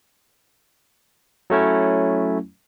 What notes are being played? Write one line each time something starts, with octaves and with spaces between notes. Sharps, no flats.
F#3 A3 C#4 E4